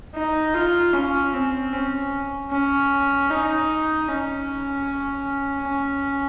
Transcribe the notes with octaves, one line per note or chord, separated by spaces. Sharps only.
D#4
F4
C#4
C4
C#4
C#4
D#4
C#4
C#4